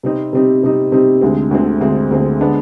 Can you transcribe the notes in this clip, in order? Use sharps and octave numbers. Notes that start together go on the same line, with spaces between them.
C3 G3 C4 D#4
C3 G3 C4 D#4
C3 G3 C4 D#4
C3 G3 C4 D#4
D2 D3 G#3 C4
D2 D3 G#3 C4
D2 D3 G#3 C4
D2 D3 G#3 C4
D3 G#3 B3 D4